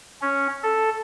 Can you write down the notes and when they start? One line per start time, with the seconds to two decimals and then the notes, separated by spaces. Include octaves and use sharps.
0.22 C#4
0.63 A4